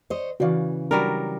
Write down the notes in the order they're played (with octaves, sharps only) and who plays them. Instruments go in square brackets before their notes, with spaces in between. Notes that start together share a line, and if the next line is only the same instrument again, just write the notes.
[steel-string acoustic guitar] C5 C#5 D#5
[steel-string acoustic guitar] C#3 E3 [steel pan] F#4 D5 F5
[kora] F#3 G3 A#4 [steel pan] D4